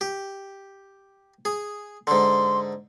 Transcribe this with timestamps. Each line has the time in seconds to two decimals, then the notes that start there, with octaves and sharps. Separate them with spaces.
0.01 G4
1.45 G#4
2.07 G#2 D3 C6